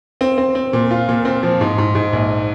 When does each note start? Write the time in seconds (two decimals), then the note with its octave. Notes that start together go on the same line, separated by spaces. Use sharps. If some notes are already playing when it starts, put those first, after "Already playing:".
0.21 C4
0.38 C4
0.55 C4
0.73 A#2
0.91 F4
1.09 A#2
1.25 C4
1.43 F3
1.61 G#2
1.78 G#2
1.95 G#2
2.13 A#1